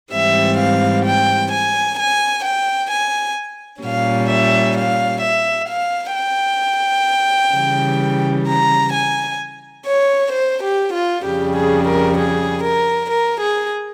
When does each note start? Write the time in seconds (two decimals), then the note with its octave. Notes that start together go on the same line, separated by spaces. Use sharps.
0.12 G#2 E3 G3 C4 E5
0.58 F5
1.05 G5
1.51 G#5
1.97 G#5
2.43 G5
2.90 G#5
3.82 A#2 G3 C#4 F5
4.29 E5
4.76 F5
5.21 E5
5.68 F5
6.15 G5
7.54 C#3 E3 G3
8.47 A#5
8.93 G#5
9.85 C#5
10.33 C5
10.62 G4
10.94 F4
11.24 F2 C#3 G3 G4
11.56 G#4
11.87 A#4
12.18 G#4
12.64 A#4
13.10 A#4
13.41 G#4